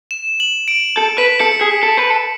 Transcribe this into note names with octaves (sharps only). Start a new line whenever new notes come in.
E7
F#7
D7
A4
B4 B6
A4 C#7
G#4
A4
B4
A4